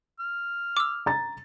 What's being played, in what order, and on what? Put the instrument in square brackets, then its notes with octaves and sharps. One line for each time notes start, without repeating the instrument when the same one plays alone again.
[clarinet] F6
[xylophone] D6 E6
[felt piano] A#5 A6